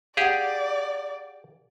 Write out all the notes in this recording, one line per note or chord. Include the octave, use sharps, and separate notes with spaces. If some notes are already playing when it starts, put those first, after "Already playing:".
G4 G#4 D5 F5 F#5